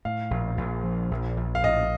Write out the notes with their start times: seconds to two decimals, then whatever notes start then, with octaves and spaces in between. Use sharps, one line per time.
0.05 A2 F5
0.31 A#1
0.57 A#1
0.84 F3
1.11 A#1
1.37 A#1
1.55 F5
1.63 A2 D#5